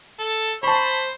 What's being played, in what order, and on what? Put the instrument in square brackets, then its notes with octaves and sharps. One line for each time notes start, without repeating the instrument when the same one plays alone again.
[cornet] A4
[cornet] C5 [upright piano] A5 C#6 [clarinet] B5